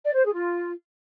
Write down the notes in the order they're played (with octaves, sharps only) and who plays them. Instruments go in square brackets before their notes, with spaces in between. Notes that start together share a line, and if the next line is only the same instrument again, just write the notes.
[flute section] D5
C5
G#4
F4